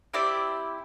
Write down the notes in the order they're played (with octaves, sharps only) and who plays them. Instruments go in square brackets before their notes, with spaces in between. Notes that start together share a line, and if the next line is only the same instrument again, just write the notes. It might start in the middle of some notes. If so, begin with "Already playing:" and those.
[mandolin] C4 E4 G4 D5